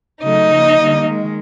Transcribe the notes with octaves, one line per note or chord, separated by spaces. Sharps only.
C#3 F#3 A3 D#4 D#5
C#3 F3 A#3
D3 G3 A#3
D#3 G#3